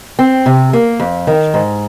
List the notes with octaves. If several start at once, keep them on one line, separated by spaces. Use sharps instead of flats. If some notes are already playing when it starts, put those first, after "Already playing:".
C4
C3
A#3
F2
D#3
G#2